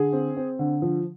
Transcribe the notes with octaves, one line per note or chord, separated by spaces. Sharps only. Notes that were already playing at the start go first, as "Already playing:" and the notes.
Already playing: D3 G#4
C4
C4
D3
F3